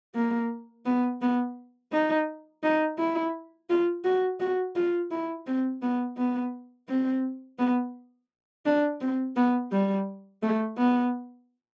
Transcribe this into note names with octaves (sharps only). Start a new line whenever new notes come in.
A#3
B3
B3
D#4
D#4
E4
F4
F#4
F#4
F4
E4
C4
B3
B3
C4
B3
D4
C4
B3
G3
A3
B3